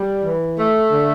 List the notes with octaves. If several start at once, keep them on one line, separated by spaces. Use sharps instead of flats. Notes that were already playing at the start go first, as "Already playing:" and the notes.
Already playing: G3
E3
A3
D3